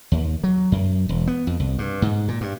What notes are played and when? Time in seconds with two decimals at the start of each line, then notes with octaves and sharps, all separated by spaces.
0.12 D#2
0.44 F#3
0.72 F#2
1.09 E1
1.27 B3
1.47 F2
1.60 C2
1.79 G2
2.02 G#2
2.28 A#2
2.41 G2